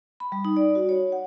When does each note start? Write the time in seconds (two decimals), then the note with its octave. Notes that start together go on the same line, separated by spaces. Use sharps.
0.20 B5
0.32 G3
0.45 D#4
0.57 D5
0.75 F#4
0.89 C#5
1.12 F#5